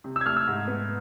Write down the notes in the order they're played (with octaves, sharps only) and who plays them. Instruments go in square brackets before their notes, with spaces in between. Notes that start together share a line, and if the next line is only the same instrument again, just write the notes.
[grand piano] C3
E6
G#6
A3 F6
E6
G#2
B3